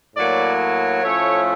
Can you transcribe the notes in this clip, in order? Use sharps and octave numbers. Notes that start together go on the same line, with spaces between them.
A2 F#3 A#3 D5
A2 F3 A3 C#4 C#5